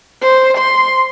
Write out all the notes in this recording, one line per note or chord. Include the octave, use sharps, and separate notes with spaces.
C5
C6